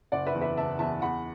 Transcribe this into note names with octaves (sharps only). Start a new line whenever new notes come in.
F#1 D5 F#5
B4 E5
E2
B4 E5
F#1 E5 A5
E2 E5 A5
E2 F#5 B5